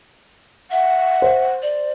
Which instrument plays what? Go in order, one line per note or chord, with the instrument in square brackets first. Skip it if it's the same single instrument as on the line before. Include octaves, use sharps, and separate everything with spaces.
[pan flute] E5 [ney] F#5
[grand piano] C5
[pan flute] D5